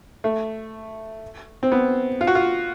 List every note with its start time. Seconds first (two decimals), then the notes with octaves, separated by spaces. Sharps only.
0.24 A3
1.63 C4
1.72 B3
2.21 F4
2.27 F#4
2.35 F4